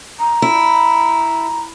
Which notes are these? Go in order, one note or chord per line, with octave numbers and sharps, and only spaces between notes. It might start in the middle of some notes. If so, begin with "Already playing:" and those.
A#5
E4